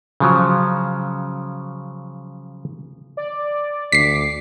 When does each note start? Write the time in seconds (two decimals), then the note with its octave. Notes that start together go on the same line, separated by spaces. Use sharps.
0.20 C#3 F3 F#3
3.17 D5
3.92 D2 D6 B6 C7